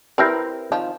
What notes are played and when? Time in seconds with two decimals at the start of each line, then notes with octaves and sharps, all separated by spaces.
0.18 C4 E4 G4 A#4 B4
0.72 D#3 F3